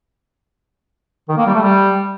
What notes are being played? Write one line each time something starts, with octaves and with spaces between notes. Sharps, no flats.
D#3
A#3
G3
A3
G3